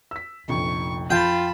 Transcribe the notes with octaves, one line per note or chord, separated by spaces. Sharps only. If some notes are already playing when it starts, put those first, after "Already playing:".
E6 B6
F1 A#1 F2 C#6
F2 F4 G5 A5 B5